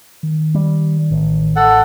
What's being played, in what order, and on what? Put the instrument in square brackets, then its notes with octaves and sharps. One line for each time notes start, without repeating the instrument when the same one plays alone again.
[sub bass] D#3
[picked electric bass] G3
A1
[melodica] A4 F#5